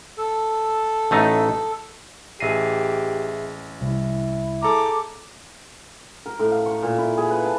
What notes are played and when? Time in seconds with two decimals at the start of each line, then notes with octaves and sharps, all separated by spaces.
0.17 A4
1.11 A1 A3 D#4
2.40 A1 G4 G#4 E5 A#6 C7 D#7
3.81 C2 E4
4.63 G#4 A4 A#5 D6
6.26 A#4
6.39 A2
6.52 F5
6.66 C#6
6.83 A#2
6.98 E4
7.17 G#4
7.31 B4
7.45 A5